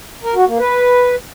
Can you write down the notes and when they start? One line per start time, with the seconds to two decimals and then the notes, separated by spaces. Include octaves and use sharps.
0.24 A#4
0.35 F#4
0.47 A#3
0.59 B4